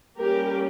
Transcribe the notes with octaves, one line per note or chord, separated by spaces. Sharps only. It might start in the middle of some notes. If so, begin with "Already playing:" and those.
G3 A#3 C#4 G4 A#4